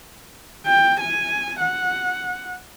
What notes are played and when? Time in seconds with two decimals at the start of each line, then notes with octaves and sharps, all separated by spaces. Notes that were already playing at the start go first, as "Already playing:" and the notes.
0.66 G5
1.00 G#5
1.60 F#5